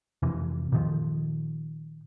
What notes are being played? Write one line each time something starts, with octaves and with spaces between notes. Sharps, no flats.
F2 C3 E3
A#2 D#3 F3